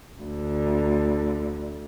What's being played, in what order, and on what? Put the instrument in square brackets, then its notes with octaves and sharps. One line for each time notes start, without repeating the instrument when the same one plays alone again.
[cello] D2 D3